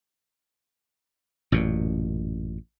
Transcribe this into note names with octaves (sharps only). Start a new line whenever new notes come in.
A1 F#2 A#2